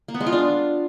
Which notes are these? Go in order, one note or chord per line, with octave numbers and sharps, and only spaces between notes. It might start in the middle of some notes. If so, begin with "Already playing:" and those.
A#3
B3
G#3
F4
D4